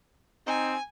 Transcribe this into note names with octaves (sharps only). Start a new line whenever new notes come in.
C4 D#4 G#5